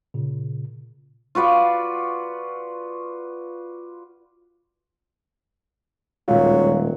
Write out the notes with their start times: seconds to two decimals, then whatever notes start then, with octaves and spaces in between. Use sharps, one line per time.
0.14 A#2 C#3
1.35 F4 F#4 B4 D5
6.28 D#1 A#2 F#3 G#3 F4 F5